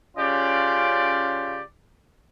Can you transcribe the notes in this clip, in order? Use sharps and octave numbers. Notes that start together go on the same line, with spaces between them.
C#3 C#4 F4 G4 D5